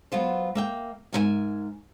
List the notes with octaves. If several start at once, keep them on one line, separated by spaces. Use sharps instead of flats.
F#3 B3 F4 C5
A#3 E5 G5
G#2 F4 A#4 C5 E5 G#5